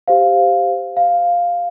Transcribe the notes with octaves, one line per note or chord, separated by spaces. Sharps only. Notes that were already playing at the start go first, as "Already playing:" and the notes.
G4 C5 F5
F5